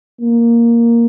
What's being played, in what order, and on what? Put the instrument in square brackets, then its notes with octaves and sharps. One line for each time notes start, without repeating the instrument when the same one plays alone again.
[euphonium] A#3